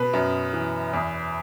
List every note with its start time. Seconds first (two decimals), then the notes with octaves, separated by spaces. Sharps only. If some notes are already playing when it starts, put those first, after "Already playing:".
Already playing: B2 B4
0.14 F#2
0.53 E3
0.93 E2